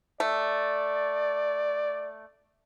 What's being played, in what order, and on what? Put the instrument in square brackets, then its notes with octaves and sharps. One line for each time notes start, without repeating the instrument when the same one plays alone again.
[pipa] A3 [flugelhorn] D5